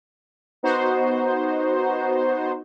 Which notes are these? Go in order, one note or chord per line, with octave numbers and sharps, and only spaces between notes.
B3 D#4 F#4 C5